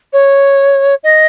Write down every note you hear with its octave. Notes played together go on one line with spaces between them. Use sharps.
C#5
D#5